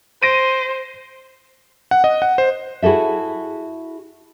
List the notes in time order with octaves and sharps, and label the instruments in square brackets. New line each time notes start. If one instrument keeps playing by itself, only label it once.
[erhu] C5 [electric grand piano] A#6 D7 D#7
[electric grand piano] F#5
D#5
F#5
C5
[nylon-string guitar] E4 F#4 G#4 A4 E5